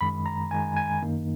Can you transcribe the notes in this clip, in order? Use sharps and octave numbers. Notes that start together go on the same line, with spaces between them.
F#2 D#3 G#3 B5
A#5
F#2 D#3 G#3 G#5
G#5
F#2 D#3 A#3 D#4